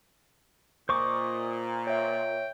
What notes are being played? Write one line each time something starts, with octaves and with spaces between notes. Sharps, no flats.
A#2 C5 D#5 C#6 D6
C#5 E5 G5